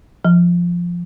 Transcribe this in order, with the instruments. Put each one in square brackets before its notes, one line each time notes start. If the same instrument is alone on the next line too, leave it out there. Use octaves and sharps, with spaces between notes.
[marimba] F3